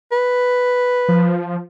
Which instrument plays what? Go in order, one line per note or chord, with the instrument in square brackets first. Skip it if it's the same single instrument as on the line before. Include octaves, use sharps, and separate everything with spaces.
[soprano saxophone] B4
[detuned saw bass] F3